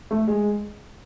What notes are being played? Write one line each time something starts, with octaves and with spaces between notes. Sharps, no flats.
A3
G#3